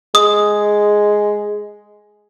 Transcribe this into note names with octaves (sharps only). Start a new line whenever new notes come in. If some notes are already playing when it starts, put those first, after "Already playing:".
G#3 D#6